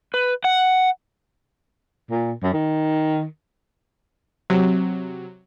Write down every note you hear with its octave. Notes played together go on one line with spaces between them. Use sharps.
B4
F#5
A#2
F#2
D#3
C3 F#3